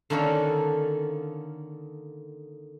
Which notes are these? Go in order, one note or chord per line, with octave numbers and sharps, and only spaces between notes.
D3 D#3 A#3 C#4 F#4 A4